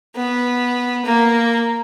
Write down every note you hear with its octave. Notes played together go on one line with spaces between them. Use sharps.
B3
A#3